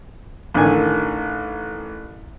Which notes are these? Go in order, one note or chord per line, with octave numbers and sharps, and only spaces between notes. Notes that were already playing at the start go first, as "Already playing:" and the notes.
A1 D3 D#3 G#5